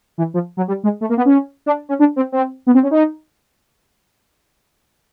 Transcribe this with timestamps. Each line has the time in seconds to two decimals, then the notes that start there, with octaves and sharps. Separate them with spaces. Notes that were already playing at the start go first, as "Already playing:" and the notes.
0.18 E3
0.34 F3
0.57 F#3
0.68 G3
0.84 G#3
1.01 A3
1.09 A#3
1.17 B3
1.25 C#4
1.66 D4
1.89 C#4
1.99 D4
2.16 C4
2.32 C4
2.67 B3
2.74 C4
2.83 C#4
2.91 D#4